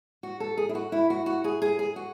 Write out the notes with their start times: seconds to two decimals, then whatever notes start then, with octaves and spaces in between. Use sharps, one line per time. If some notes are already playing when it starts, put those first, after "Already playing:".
0.23 F#4
0.40 A4
0.57 G#4
0.69 E4
0.75 F#4
0.92 E4
1.10 F#4
1.26 F#4
1.44 G#4
1.62 G#4
1.79 G#4
1.96 F#4